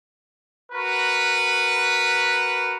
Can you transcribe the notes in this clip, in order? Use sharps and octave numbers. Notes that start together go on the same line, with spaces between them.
F#4 A#4 B4